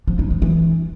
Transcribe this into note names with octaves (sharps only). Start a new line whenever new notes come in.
F3
D#4
D#3
E3